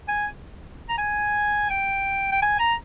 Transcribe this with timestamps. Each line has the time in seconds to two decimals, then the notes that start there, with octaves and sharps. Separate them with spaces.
0.08 G#5
0.89 A#5
0.98 G#5
1.70 G5
2.32 G5
2.42 G#5
2.60 A#5